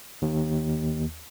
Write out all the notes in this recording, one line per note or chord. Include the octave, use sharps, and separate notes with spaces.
D#2